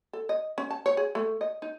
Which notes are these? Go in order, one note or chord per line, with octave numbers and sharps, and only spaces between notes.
A4
D#5
C#4
A5
C#5
G#4
A3
D#5
D#4